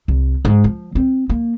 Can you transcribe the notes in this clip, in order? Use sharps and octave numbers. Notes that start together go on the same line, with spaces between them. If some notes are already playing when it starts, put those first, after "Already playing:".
C2
G#2
F3
C4
A#3